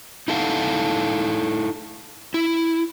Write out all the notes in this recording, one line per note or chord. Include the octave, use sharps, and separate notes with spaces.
D#4 E4 A4 F5 F#5
E4